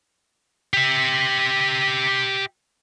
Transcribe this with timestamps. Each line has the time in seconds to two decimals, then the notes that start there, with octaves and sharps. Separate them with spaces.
0.73 G4 E5